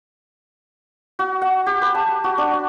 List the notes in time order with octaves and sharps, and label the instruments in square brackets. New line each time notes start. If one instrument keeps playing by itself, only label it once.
[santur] F#4
F#5
G4
B4
A5
F#4
D4